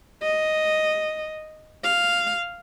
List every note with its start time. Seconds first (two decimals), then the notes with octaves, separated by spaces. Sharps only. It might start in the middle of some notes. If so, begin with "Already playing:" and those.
0.23 D#5
1.84 F5